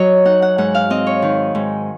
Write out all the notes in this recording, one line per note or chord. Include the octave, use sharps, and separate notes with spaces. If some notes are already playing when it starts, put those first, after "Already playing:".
Already playing: F#3 C#5 D#5
D#4 F#5
F#5
G#2 F#5
F5
C4 D#5
C#5
D#3
G#2